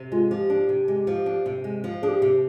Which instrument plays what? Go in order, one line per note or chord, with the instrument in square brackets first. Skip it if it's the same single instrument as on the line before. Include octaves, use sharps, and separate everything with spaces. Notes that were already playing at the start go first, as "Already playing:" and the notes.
Already playing: [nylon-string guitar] C3
[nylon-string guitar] G#3 [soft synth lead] F4
[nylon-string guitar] F3 [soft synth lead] G4
[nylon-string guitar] D4
C3
G#3
F3
D4
C3
G#3
F3
[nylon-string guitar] D4 [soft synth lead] G#4
[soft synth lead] G4
[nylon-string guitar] C3